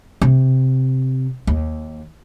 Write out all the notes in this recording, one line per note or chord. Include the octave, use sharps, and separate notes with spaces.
C3
D#2